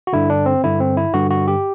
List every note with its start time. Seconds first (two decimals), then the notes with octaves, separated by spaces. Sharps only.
0.07 F#4
0.13 G2 D3 E4
0.30 D4
0.46 C4
0.64 G2 D3 E4
0.80 C4
0.97 E4
1.14 G2 D3 F#4
1.30 F#4
1.48 G4